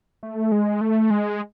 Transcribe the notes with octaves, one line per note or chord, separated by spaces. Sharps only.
A3
G#3
A3
G#3